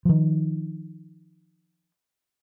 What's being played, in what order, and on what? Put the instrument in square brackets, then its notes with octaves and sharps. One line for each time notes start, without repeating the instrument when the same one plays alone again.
[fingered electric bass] D#3 F3